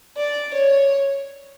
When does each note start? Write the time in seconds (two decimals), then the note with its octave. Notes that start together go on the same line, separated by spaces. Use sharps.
0.17 D5
0.54 C#5